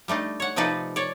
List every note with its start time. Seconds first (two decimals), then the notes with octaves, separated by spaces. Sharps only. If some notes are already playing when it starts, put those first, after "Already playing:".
0.08 G3 A3 D4 D#4
0.40 C#5 F#5
0.56 C3 F3 D#4 A4 B4 D5
0.96 C#5 D5